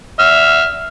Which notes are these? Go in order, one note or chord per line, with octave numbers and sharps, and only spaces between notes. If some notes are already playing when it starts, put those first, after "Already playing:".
E5 F6